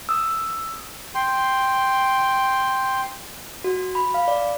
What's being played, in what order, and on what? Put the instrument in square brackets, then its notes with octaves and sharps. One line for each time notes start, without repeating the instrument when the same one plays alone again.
[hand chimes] D#6 E6
[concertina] G5 C6
[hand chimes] F#4
B5
F5
D5